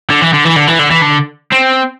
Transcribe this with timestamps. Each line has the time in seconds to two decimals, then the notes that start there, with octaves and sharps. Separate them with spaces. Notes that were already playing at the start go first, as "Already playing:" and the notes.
0.10 D3
0.21 E3
0.33 D3
0.45 E3
0.56 D3
0.67 E3
0.79 D3
0.91 E3
1.02 D3
1.52 C4